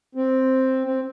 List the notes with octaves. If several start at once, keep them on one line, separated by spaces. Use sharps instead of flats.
C4
C4